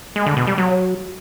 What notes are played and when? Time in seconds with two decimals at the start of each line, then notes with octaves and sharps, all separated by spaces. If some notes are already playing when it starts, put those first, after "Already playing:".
0.16 G#3
0.26 D3
0.37 B2
0.47 G3
0.58 F#3